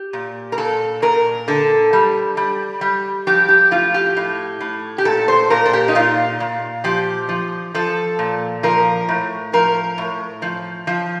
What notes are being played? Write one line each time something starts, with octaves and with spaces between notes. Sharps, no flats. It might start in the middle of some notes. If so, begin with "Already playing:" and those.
Already playing: G4
A#2
A#4
A#2 A4
A#2 A#4
D3 A4
G3
G3
G3
F3 G4
G4
A2 F4
G4
A2
A2
G4
A#2 A4
C5
A#2 A#4
A4
G4
D#4
A#2 F4
A#2
F3 G4
F3
F3 A4
A#2
F3 A#4
A2
F3 A#4
A2
F3
F3